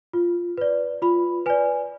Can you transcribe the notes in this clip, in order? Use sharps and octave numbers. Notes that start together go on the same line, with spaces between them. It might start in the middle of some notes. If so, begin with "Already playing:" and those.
F4
B4 D5
F4 B5
B4 D5 G#5